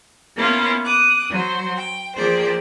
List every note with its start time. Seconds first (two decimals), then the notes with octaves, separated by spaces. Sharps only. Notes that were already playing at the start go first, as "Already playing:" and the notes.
0.36 A#3 B3 C#4 E4 F4
0.84 D6 D#6 F#6
1.29 F#3 C5
1.78 G5
2.15 F3 A#3 G4 G#4 C5 D5